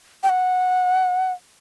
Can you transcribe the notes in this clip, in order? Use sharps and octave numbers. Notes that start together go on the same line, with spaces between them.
G5
F#5